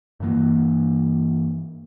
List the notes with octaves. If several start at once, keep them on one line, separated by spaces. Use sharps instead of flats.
G2 E3 A#3